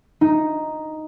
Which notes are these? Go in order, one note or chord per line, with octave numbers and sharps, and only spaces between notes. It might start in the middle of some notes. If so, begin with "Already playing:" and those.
D#4